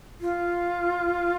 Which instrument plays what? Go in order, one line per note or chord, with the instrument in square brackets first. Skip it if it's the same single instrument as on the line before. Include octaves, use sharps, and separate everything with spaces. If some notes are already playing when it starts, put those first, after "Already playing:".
[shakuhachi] F4